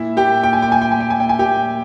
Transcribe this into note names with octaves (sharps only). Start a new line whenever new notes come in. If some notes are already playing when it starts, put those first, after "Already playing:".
Already playing: A#2 E4 E5
A#2 G4 G5
A#2 G5
G#5
G5
A#2 G#5
G5
A#2 G#5
G5
G#5
A#2 G5
G#5
G4 G5
A#2